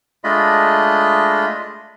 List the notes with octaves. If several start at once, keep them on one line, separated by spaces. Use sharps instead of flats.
G#3 A3 D4 F4 D#5 B5